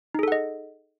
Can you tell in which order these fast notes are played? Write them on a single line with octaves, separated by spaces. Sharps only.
D#4 G#4 A4 F#5 D#5